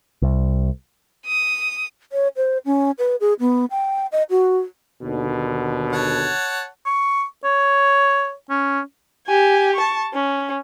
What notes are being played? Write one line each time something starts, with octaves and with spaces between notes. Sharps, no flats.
C2
D#6
C#5
C5
C#4
B4
G#4
B3
G5
D#5
F#4
D#2 B2 D3
C#5 F#5 A5
C#6
C#5
C#4
G4 G#5
A5 C#6
C#4